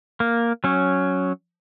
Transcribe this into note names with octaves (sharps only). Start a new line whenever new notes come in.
A#3
F#3 C#4